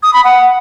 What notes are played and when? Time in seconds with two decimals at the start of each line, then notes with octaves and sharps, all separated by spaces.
0.03 D#6
0.14 B5
0.24 F#5